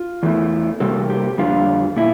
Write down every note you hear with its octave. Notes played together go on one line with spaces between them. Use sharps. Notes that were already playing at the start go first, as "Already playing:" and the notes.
Already playing: F4
E2 E3 A3
C3 G3 A#3 A4
G4
F2 D3 G3 F4
A#2 E4